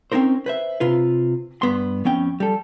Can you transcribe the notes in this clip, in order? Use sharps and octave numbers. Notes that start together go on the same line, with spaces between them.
C4 C#4 D#4 A#4 C5
B4 C5 E5
C3 F4 B4
G2 B3 C6
F2 B3 C#4 G5
G3 A4